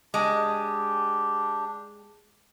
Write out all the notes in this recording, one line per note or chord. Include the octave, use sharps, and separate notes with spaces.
G#3 D4 G4